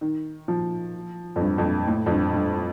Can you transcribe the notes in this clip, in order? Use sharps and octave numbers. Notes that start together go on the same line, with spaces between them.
D#3
F3
F2
G2
F2
G2
A2
F2
G2
G2